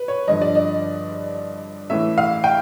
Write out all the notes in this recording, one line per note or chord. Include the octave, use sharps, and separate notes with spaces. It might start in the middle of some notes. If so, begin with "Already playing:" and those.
Already playing: B4
C#5
G2 D3 F3 D#5
D5
D#5
A2 E3 A3 C#4 E5
F5
G5